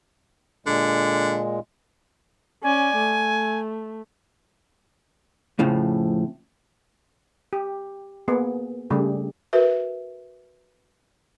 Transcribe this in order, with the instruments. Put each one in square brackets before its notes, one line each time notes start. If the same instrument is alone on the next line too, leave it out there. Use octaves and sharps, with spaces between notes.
[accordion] A#2 G#3 [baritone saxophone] D3
[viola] C#4 D5 [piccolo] G#5
[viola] A3
[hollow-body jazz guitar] F2 A2 C#3 F3
[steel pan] G4
A#3 B3 G#4
C#3 G3 A3 D4 G4 G#4
[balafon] F#4 A#4 B4 E5